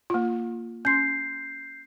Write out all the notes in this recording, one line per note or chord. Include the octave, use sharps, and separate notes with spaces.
A#3 F4
C#4 C6 G6 C7